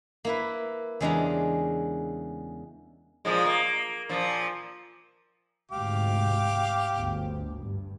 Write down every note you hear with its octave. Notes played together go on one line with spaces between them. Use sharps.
A#3 E4 B4
E2 C#3 G#3 D4 G4 A#5
A#2 F3 G#3
A#3
A#2 F3
D2 G#2 C3 G4 F5 D6
G1 D2
G2